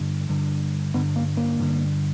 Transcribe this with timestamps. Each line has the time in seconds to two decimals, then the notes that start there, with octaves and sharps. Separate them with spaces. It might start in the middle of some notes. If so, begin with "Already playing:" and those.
Already playing: G2 D3
0.29 G2 D3
0.94 G2 D3 B3
1.16 A#3
1.37 A#3
1.59 G2 D3